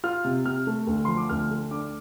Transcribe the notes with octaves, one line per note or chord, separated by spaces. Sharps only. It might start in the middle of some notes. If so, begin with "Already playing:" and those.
F4 F6
C3
C3 F6
A3
D2
F3 C6
D6
D2 F6
A3
D4 D6